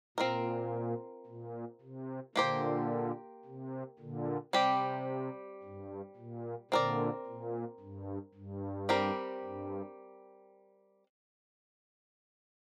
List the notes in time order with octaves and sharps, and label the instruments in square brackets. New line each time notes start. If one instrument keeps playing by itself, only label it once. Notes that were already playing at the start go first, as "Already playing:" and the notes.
[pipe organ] A#2 [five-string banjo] C4 F4 A#4
[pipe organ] A#2
C3
[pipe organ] A#2 D3 [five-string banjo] A#3 G4 C5
[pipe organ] C3
A#2 D3
[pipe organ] C3 [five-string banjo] G3 C4 G4
[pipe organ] G2
A#2
[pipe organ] A#2 D3 [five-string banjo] C4 A#4 D5
[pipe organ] A#2
G2
G2
[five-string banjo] G3 C4 G4 A#4
[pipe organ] G2